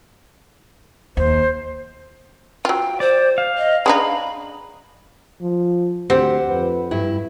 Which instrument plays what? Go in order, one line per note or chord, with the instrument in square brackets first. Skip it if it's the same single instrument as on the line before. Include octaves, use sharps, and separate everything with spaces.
[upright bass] D#2 [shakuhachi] C5
[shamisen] F#3 F4 [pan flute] G5
[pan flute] C5 [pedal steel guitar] D5
[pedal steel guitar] F5
[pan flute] D#5
[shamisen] G#3 D4 D#4 [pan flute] B5
[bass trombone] F3
[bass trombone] D2 [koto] C4 [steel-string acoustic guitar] G4 C5 F#5
[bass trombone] F2 [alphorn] B4
[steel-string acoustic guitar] G2 E4